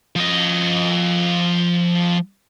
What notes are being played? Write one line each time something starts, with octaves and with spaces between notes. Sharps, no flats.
F3 D#5